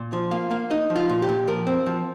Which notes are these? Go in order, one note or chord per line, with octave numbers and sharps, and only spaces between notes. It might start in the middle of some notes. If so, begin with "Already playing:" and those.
Already playing: A#2
F3
A#3 F5
A#3 F5
D#4 D#5
F3
F4
A#2
G4
A#2
F3 A#4
C4
F3